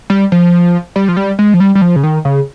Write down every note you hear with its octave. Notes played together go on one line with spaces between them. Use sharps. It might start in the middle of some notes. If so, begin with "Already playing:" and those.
G3
F3
G3
F3
G3
G#3
F3
G3
G3
F3
C#3
D#3
C#3